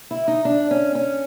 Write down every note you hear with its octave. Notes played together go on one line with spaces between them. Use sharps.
E4
D#4
D4
C#4
C#4